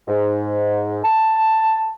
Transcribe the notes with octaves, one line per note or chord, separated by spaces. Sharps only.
G#2
A5